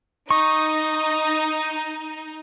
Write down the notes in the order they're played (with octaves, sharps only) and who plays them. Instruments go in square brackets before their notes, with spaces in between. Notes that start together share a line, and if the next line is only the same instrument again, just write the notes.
[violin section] D#4 [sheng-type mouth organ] D#5 [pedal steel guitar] C#6